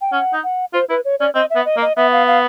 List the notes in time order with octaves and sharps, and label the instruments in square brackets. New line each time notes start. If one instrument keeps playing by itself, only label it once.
[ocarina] G5
[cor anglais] C#4 [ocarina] F#5
[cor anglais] D#4
[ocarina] F#5
[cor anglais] F4 [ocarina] C5
[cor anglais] E4 [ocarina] B4
[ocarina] C#5
[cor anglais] C#4 [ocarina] D5
[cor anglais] C4 [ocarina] D#5
[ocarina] E5
[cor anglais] B3
[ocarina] D#5
[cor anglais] A#3
[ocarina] D#5
[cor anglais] B3 [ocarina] E5
[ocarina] F5
F5